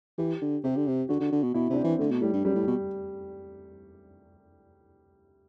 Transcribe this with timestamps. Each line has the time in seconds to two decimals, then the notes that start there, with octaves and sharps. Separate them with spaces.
0.18 E3 G4
0.42 D3
0.64 C3 G4
0.76 D3
0.88 C3
1.09 D3 F#4
1.20 D3
1.32 D3
1.43 B2
1.54 B2 E4
1.70 C3 D4
1.76 C4
1.84 E3
1.99 D3 A3
2.11 B2
2.22 A2 G3
2.33 G2
2.45 F#2 G3
2.55 A2
2.67 B2